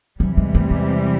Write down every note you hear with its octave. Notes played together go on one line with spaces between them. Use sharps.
E2 C3 E3 F#3 G3
G#3
A3
G#3